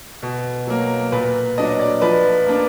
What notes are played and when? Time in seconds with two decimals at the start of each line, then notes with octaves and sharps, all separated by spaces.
0.23 B2
0.67 F#3 A#3
1.12 A#2 B4
1.58 F#3 D4 D#5
1.79 D5
2.02 F3 B4
2.46 A#3 D4